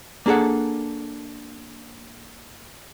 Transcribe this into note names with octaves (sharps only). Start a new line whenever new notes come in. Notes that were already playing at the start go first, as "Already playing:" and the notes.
A#3 D4 G#4 A4 F#5